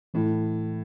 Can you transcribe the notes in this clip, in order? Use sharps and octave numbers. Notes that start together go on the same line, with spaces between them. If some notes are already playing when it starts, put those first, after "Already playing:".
A2 E3 A3 E4